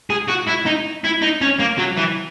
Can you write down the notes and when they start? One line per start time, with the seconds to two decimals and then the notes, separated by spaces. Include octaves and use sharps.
0.10 G#4
0.29 F#4
0.48 E4
0.66 D#4
1.04 E4
1.22 D#4
1.41 C#4
1.59 A#3
1.78 F#3
1.97 E3